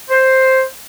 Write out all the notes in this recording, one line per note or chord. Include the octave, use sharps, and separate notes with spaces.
C5